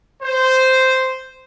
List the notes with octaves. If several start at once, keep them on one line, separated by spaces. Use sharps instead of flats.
C5